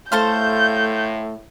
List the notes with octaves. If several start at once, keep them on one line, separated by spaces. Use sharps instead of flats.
A2 A3 A4 C5 F5 G6